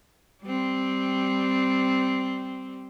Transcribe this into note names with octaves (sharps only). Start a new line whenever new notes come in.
G3 C4